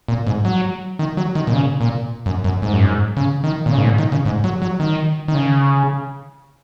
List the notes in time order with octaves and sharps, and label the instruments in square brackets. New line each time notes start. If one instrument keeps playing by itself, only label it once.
[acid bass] A#2
G#2
F#3
D#3
F#3
D#3
A#2
C#3
A#2
F#2
F#2
G#2
F#2
G#2
C#3
D#3
A#2
C#3
G#2
A#2
D#3
C#3
G#2
F#3
F#3
D#3
D#3
C#3